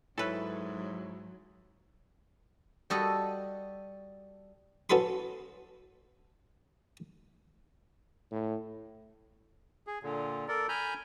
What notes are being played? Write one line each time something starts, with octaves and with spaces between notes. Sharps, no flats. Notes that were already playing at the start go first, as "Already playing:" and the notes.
G#2 F#3 E4 A4 B4 C#5
G3 F#4 A4 D#5
C#4 F#4 A4 B4 B5 C6
A2
G#4
A#2 D3
A4 A#4 D5
G#5 A#5 B5 F6 G6